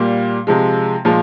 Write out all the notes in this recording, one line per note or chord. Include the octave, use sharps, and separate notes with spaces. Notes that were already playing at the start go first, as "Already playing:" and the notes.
Already playing: A#2 G3 A#3
C3 F3 G#3
A#2 F3 G#3